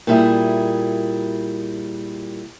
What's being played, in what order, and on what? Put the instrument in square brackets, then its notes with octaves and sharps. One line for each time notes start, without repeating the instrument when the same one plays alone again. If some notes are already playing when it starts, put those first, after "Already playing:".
[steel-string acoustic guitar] A#2 G3 E4 G#4